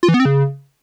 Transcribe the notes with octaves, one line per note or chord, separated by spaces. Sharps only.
F4
E3
B3
C4
C#3